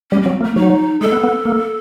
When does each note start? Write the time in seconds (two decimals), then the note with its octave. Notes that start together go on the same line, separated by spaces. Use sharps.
0.11 G3 C#4
0.22 F#3 C4
0.41 A#3
0.45 A3
0.56 F#3 D#4
1.01 G#3 A4
1.12 B3
1.24 B3
1.45 A#3